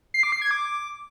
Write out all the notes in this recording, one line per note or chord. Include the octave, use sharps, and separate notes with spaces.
C7
D6
C7
G#6
D6